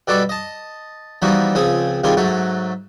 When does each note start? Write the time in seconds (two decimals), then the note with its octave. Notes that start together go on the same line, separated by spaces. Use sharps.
0.07 B2 G3 F#4 A4 D6
0.29 D#5 A5
1.22 E3 F3 G3 B3 D#4 F#4
1.55 C#2 F3 C4 G#4 D#6
2.04 C3 D#3 G3 F4 G#4
2.17 G#2 F#3 A3 F#4